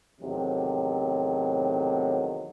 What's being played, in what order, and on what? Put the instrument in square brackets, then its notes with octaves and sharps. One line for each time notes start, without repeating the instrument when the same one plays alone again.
[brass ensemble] E2 A2 C3 D#3 F#3